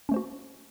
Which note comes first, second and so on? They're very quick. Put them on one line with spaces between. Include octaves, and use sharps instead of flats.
C#4 A3 C5 F#4